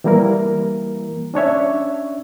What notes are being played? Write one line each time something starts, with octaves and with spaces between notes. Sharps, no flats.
E3 G3 A#3 E4 A#4
C#4 D4 C#5 E5